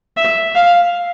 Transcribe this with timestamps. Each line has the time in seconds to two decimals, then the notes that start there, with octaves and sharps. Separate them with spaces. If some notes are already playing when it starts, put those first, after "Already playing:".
0.17 E5
0.55 F5